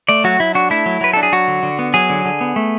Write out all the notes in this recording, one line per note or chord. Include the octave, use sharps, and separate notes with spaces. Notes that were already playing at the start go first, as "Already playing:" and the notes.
A3 D5
F#3 F#4
F#3 E4
D4 F#4
A3 E4
F#3
F#3 B4
D4 A4
G#4
F#3 F#4
D3
D3
B3
F#3 G#4
D3
D3
B3
A3